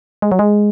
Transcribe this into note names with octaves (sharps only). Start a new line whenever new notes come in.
G#3
F#3
G#3